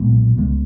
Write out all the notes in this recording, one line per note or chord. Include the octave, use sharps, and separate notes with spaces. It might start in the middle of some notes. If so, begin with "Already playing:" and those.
Already playing: B1 A#2 G#3 B3
C#2 C#3 G#3 B3